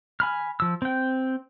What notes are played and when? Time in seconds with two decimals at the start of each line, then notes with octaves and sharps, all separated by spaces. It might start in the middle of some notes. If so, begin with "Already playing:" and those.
0.20 G#5 B5 F6
0.60 F3 E6
0.82 C4 G5